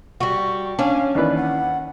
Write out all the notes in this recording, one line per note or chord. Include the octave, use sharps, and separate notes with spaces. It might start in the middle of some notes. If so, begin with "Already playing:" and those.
G3 F#4 C#6
C#4 D4 F5
D#2 E3 B4 D5
F#5